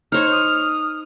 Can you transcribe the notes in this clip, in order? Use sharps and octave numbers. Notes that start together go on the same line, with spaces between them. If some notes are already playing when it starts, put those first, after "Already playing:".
D#4 C5 C#5 C#6 F6
D#6